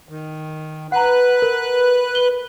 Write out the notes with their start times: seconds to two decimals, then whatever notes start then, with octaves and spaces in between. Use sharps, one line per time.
0.09 D#3
0.92 B4 F#5 A#5 F#6
1.42 A#4
2.15 G7